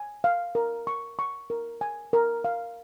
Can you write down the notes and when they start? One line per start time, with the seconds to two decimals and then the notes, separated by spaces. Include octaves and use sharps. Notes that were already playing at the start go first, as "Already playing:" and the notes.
Already playing: G#5
0.24 F5
0.55 A#4
0.87 C#6
1.19 C#6
1.50 A#4
1.81 G#5
2.13 A#4
2.44 F5